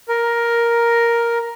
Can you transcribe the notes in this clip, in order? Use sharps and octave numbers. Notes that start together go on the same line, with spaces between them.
A#4